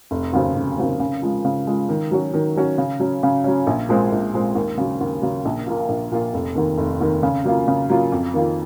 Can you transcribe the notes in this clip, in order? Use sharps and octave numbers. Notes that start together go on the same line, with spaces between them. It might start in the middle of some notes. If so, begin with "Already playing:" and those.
F1
D#2 C#3 F#3 C4
F1
D#2 C#3 F#3 C4
C#3
F3 G#3
C#3
F3 G#3
D#3
F#3 C#4 F#4
D#3
F#3 C#4 F#4
C#3
F#3 C#4
C#3
F#3 C#4
A#1
A#2 G#3 C4
A#1
A#2 G#3 C4
D#2
C#3 F#3
D#2
C#3 F#3
A#1
A#2 F3 A#3 F4
A#1
A#2 F3 A#3 F4
F1
D#2 D#3
F1
D#2 D#3
C#3
F#3 A#3 F4
C#3
F#3 A#3 F4
F2
D#3 A#3 F4